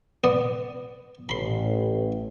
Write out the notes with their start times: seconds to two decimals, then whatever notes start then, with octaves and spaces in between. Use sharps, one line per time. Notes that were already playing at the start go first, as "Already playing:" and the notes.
0.24 B3 D5 D#6
1.29 A1 B5 C6